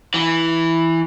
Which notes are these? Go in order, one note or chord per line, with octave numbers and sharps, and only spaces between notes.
E3